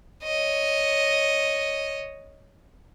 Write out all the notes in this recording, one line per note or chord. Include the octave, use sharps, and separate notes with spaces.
C#5 D#5